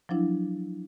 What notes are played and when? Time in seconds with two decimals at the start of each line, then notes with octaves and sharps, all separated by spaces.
0.09 F3 F#3 D4 E4